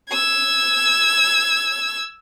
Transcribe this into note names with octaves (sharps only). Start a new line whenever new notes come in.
E6 G#6